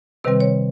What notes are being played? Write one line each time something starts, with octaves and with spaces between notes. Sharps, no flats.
C3 D#3 G3 C4 B4
C#5